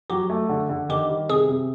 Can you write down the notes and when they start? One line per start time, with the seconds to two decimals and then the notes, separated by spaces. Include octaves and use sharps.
0.10 F#3 G4
0.30 A3
0.49 D3
0.69 D3
0.89 D#3 G4
1.09 G3
1.29 C3 G#4
1.49 C3